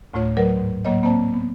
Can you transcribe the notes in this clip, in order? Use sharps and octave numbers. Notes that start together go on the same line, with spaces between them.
D2 A2 A3 F4 C#5
F#3 A#4 B4 D5 F#5
G#2
A2 F#3 A#3 C#5 D#5
A#3 C4 C5 D5 A5
B3